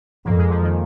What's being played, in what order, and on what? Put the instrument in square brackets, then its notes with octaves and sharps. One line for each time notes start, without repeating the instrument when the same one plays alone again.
[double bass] F2 [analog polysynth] A#3
[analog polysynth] G#3
F3
D#3